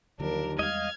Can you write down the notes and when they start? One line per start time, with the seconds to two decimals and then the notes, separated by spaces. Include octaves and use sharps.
0.20 D#2 D3 F3 F#3 D4 A#4
0.59 E2 G3 G#3 D#5 F5 F6 G#6